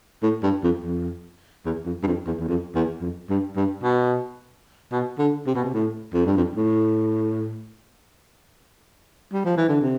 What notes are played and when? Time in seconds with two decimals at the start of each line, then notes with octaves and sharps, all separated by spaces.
0.23 A2
0.43 G2
0.64 F2
0.84 F2
1.65 E2
1.86 F2
2.03 G2
2.06 F2
2.26 E2
2.39 E2
2.48 F2
2.75 E2
3.01 F2
3.29 G2
3.56 G2
3.83 B2
4.92 B2
5.19 D3
5.47 C3
5.55 B2
5.64 C3
5.73 A2
6.14 F2
6.26 G2
6.37 F2
6.55 A2
9.33 G3
9.45 F3
9.57 E3
9.68 D3
9.81 C3